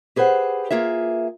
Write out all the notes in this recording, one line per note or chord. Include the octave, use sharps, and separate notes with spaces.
G4 G#4 B4 C5 F#5
A#3 F4 G#4 E5